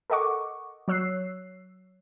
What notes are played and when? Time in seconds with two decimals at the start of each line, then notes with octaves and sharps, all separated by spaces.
0.10 A4 A#4 D#5 F#5 C#6 D6
0.88 F#3 C#5 E6 F#6 C7